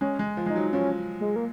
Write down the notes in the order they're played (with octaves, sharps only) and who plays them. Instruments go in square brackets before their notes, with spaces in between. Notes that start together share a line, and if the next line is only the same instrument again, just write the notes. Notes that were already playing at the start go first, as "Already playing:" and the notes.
[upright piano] G#3 [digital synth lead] C#4
[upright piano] G#3
F3
[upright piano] G#3 [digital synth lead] D#4
[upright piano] F#3
[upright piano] F3 [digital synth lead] C#4
[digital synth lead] G#3
A#3